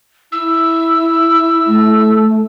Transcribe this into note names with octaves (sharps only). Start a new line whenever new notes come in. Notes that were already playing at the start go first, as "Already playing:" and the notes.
E4 E6
A3